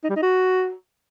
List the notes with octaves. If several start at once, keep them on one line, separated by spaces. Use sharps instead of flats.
D#4
G3
D#4
F#4